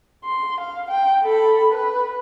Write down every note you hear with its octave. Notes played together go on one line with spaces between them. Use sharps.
C6
F5
G5
A4 B5
B4